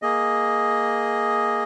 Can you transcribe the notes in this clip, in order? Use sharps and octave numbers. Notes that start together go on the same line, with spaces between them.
A#3 G#4 D#5